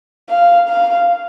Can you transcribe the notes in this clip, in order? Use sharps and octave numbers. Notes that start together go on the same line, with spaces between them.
F5
F5